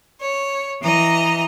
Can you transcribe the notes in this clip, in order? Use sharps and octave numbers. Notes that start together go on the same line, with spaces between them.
C#5
E3 D#5 A#5